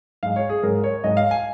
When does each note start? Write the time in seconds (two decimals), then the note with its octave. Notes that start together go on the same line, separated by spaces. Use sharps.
0.23 G#2 G#3 F5
0.36 C#5
0.49 G#4
0.63 G#2 G#3 A#4
0.84 C#5
1.04 G#2 G#3 D#5
1.17 F5
1.31 G#5